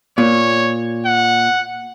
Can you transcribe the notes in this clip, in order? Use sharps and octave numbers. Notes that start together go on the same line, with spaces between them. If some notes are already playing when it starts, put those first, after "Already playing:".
A#2 C#5
F#5